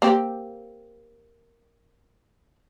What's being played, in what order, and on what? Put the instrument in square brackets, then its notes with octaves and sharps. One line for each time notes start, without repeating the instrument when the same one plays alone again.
[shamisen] A#3 C4 G4